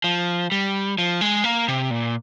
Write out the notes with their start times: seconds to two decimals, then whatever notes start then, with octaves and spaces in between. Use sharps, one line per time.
0.04 F3
0.52 G3
0.98 F3
1.21 G#3
1.44 A#3
1.68 C3
1.91 A#2